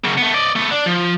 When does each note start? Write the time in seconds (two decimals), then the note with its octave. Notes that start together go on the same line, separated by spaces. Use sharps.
0.04 F#2 C#3
0.18 A3 B3
0.34 D5 D#5
0.56 A3 B3
0.71 D4
0.86 F3